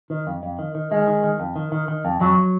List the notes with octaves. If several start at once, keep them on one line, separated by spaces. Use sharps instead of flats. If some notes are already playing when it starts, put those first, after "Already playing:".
D#3
F2
F2
D#3
D#3
D#3 G#3
D#3
D#3
F2
D#3
D#3
D#3
F2
F2 F#3